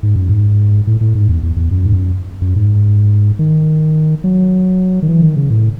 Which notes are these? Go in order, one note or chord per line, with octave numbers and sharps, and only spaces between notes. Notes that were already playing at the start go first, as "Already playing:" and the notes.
G#2
F#2
G#2
A2
A2
G#2
E2
E2
E2
F#2
G#2
F#2
F#2
G#2
D#3
F#3
D#3
E3
D#3
C#3
A2